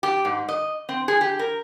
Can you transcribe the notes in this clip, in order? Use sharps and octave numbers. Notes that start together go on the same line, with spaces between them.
G4
G#2
D#5
C4
G#4
G4
A#4